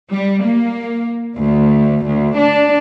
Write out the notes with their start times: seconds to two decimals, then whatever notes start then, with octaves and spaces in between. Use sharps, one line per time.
0.11 G3
0.43 A#3
1.36 D2
2.05 D2
2.36 D4